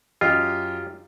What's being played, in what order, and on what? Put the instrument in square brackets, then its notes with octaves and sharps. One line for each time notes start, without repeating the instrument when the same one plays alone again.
[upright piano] F#2 G4 D#5 [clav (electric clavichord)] F4